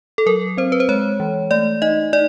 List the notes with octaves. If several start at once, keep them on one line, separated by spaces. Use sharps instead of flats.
A4
F#3 A#4
C4 C5
B4
C5
G#3 C#5
E3
A3 D5
D#4 D#5
D#4 D5